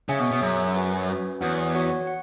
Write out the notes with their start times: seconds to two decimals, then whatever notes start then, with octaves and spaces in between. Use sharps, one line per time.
0.09 C#3 G#4 C#5 E5 G#5
0.20 B2
0.31 B2
0.41 F#2 G#4 C#5 E5 G#5
0.75 C#4 F#4 B4
1.08 C#4 F#4 B4
1.41 E2 F#4 C#5 F#5
1.75 F#4 C#5 F#5
2.07 F#5